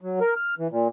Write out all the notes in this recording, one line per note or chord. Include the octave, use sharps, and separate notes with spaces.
F#3
A#4
F6
E3
A#2